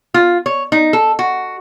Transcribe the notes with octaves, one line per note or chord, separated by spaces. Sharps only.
F4
C#5
D#4
A4
F#4